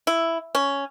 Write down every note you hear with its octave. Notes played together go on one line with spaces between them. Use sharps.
E4
C#4